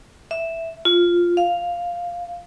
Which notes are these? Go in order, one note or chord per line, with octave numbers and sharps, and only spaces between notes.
E5
F4
F5